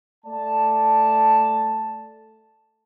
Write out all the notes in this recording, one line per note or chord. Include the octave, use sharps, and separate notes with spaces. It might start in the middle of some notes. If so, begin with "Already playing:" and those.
A3 D5 A5